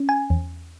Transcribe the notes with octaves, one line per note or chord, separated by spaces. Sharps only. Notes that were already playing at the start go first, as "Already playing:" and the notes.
Already playing: C#4
G#5
E2